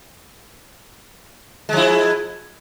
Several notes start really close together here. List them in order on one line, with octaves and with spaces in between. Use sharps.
G#3 F3 E4